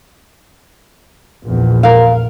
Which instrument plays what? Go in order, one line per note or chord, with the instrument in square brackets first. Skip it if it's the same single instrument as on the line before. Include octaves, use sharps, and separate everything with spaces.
[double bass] A#1 E2
[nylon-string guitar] A#4 F5